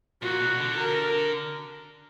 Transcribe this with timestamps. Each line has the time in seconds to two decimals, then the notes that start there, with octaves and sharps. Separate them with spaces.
0.22 A#2 F#4
0.40 B2
0.58 D3
0.76 A#4